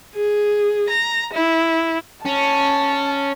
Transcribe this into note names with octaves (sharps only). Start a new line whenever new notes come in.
G#4
A#5
E4
C#4 A5